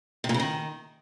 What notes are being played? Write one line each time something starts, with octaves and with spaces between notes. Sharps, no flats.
C3
A#2
C#3
D#3